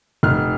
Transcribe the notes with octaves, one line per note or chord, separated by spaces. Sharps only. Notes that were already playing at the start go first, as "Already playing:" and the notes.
F1 F6